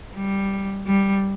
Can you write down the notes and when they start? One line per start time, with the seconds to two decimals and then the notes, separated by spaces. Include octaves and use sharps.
0.15 G3
0.87 G3